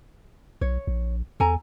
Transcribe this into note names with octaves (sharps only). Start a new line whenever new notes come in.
B1 C#5
A#1
E2 A4 G#5 A#5